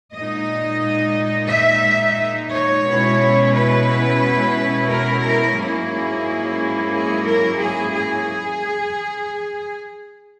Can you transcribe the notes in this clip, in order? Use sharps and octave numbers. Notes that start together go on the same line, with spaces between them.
A#2 G#3 D#4 D#5
E5
C#5
B2 G#3 C#4 E4
B4
A#4
A#4
G#2 F#3 A#3 C#4 E4 G#4
G#4
A#4
G#4
G#4